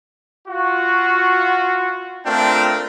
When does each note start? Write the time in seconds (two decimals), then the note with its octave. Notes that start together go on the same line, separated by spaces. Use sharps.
0.48 F4 F#4
2.26 A3 C4 D4 F4 A#4 G5